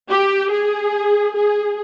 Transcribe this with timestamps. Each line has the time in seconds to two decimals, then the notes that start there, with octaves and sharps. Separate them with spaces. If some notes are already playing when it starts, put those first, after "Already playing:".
0.10 G4
0.51 G#4
1.35 G#4